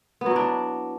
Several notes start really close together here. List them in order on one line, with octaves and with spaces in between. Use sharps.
B3 F#3 E4 D4